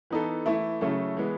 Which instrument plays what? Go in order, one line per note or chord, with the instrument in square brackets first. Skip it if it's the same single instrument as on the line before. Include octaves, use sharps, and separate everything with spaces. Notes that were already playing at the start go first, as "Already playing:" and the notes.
[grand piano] E3 B3 D#4 A4
E3 A3 E4
C#3 F#3 A3 E4 A4
E3 G#3 B3